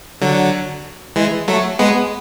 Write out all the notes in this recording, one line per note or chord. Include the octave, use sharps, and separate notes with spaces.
D3 F#3
E3 G#3
F#3 A3
G#3 B3